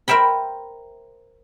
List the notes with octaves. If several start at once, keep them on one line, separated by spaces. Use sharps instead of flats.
A#4 C5 E5 G5 B5